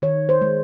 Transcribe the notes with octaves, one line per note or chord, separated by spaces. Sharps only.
D#3 C#5
C5
G#3